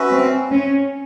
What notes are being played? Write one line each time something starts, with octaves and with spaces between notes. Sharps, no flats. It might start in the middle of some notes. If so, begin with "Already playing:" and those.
Already playing: C#4 F#4 B4 E5
C4
C#4